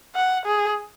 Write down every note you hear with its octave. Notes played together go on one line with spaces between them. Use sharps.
F#5
G#4